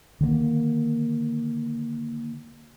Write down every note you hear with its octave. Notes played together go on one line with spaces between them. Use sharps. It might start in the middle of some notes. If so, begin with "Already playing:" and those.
D3 D#3 G#3 A#3